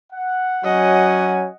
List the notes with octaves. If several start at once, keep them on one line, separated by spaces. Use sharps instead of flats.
F#5
F#3 C#4 F#4 D#5 F#5 G#5